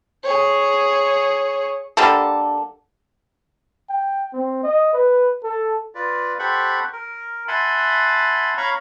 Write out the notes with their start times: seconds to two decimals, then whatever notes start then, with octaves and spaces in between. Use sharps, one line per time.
0.23 G#4 C#5
1.97 D3 G3 A#3 A4
3.89 G5
4.33 C4
4.63 D#5
4.93 B4
5.43 A4
5.95 F4 B4 D5
6.39 G4 A4 C5 F#5 B5 C#6
6.93 A#4
7.48 E5 F#5 G#5 A5 B5 C6
8.57 C#5 F5 A#5 B5 C#6